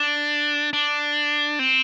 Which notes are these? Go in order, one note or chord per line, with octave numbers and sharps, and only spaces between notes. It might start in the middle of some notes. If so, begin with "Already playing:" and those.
Already playing: D4
D4
C4